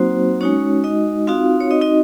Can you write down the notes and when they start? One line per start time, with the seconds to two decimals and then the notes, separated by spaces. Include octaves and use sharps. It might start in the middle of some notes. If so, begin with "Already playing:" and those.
Already playing: F#3 A#3 C4 D#4 F#4 C5
0.41 G#3 C#4 D#4 F#4 C#5
0.84 D#4 D#5
1.27 C4 D#4 F4 F#4 F5
1.60 C#5
1.71 D#4 D#5
1.81 D#4 D#5